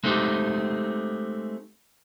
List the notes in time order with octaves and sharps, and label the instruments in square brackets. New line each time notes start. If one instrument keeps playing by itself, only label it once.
[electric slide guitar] G#3 A3 C4 D#4 G4